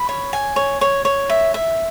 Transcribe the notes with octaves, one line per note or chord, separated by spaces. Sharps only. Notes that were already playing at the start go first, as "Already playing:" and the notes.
Already playing: B5
C#5
G#5
C#5
C#5
C#5
E5
E5